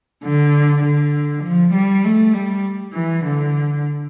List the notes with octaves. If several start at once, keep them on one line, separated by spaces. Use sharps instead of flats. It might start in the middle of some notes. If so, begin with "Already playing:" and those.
D3
D3
F3
G3
A3
G3
E3
D3